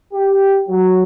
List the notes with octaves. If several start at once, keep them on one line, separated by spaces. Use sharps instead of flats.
G4
F#3